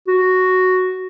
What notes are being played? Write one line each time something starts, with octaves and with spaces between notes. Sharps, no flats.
F#4